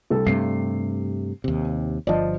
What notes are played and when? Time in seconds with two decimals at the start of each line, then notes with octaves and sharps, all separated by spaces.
0.10 C2 A4
0.27 G2 C3 A3 C7
1.44 D#2 C3
2.07 G1 F3 D5 D#5 A5